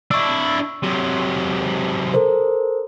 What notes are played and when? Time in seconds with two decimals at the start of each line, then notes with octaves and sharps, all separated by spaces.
0.11 D4 E4 C#6 E6
0.83 C3 F#3
2.14 A4 A#4 C5